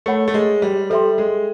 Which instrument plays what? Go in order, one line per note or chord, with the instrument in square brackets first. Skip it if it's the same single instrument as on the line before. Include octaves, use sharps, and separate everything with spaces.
[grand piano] A3 [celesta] A#4 C#5 F#5 B5
[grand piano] A3
G#3
G3
[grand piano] G3 [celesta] A4 C5 E5 G5 C6
[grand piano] G#3